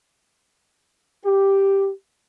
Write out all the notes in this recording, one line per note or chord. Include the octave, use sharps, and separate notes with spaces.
G4